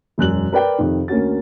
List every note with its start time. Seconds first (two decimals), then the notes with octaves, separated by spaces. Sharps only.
0.18 E1 F#2 F#6 F#7
0.52 A#4 B4 D5 G5
0.78 F2 C3 D#3
1.08 D2 A#3 C#4 F#4 A6